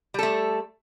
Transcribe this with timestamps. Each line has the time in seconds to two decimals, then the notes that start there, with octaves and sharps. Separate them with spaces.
0.14 G3
0.19 A4
0.23 A3